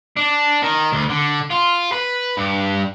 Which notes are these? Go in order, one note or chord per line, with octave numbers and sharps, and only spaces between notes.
D4
D#3
D2
D3
F4
B4
G2